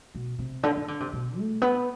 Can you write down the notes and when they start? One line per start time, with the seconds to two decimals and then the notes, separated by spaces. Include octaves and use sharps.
0.15 B2
0.39 C3
0.63 D3
0.76 E3
0.88 D3
1.00 C3
1.13 B2
1.38 A3
1.62 B3